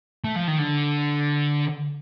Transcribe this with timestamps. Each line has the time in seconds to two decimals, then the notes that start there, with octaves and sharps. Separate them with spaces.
0.24 A3
0.36 F3
0.48 D#3
0.59 D3